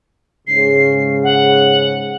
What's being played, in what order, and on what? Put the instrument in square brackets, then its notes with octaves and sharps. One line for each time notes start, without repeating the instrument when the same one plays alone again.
[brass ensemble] G#2 C#3 [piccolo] C7
[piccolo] F#5